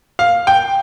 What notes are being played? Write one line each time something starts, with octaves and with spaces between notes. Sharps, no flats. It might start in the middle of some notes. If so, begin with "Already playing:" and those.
F5
G5